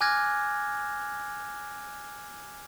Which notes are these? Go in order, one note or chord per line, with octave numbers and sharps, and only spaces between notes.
G#5 D6 F6 F#6 G#6 A#6